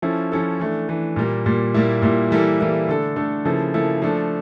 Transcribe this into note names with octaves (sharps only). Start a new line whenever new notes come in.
F3 C#4 E4 A4
F3 C#4 E4 A4
E3 A3 D4
E3 A3 D4
A#2 G3 A#3
A#2 G3 A#3
A#2 G3 A#3 E4
A#2 G3 A#3 E4
E3 G3 A#3 E4 A4
E3 G3 A#3 E4 A4
D3 A3 D4 A4
D3 A3 D4 A4
C#3 F3 A#3 E4 A4
C#3 F3 A#3 E4 A4
F3 A3 D4 A4